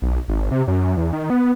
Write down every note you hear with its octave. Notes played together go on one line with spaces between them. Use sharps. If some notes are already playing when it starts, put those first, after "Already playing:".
B1
G#1
C3
F#2
E2
D#3
B3